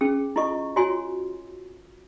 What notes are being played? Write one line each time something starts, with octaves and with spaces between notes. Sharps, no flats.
C#4 G#4
E4 F4 A4 D#5 C#6
F4 F#4 C#5 G#5 C6